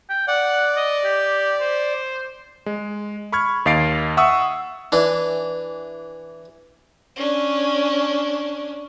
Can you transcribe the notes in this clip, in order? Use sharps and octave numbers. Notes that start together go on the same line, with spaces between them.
G5
D5 F#5
D#5
G4
C5
G#3
B5 C#6 F6 G#6
D#2 D#5 F5 A6 C7 D7
E5 F#5 C#6 D#6 E6
E3 D4
C#4 D4